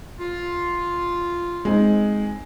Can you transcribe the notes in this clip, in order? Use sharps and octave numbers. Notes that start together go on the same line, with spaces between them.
F4
G#3 C4 D#4